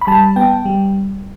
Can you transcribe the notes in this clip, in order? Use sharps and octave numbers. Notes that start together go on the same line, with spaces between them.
B5
G3 A5
B3 G5
G3